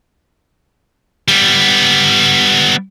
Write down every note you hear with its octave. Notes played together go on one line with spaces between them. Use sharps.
G3 B3